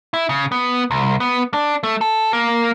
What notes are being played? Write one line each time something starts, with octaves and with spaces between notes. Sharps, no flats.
E4
C#3
B3
C2
B3
D4
A3
A4
A#3